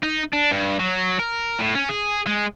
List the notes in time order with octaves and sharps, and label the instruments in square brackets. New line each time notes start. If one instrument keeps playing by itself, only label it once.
[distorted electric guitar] D#4
D4
G2
F#3
A#4
A2
C#4
G#4
G#3